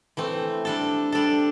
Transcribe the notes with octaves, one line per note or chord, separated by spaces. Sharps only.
E3 A3 C4
G3 D4 A4
G3 D4 A4